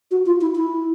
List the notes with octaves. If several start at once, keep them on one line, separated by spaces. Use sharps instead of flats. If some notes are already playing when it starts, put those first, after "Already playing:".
F#4
F4
E4
E4